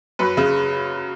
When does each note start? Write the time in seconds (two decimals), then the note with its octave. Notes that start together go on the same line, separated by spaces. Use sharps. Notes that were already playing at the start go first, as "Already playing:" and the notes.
0.19 F#2 B4
0.37 C#3